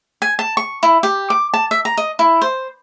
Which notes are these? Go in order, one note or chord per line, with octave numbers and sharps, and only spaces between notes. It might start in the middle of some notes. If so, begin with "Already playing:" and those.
G#5
A5
C#6
E4
G4
D6
A5
E5
A#5
D#5
E4
C5